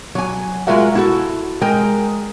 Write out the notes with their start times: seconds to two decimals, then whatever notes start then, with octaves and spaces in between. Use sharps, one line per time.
0.15 F#3 G#5
0.67 G#3 F4 F#4 A#4 E5 F#5
0.95 E4 F#4 A4
1.62 G#3 A#4 G5